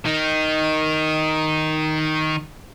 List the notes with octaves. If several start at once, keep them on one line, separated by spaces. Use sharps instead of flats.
D#3 D#4